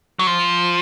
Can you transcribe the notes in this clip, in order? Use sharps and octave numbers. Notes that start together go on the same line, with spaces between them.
F#3
F3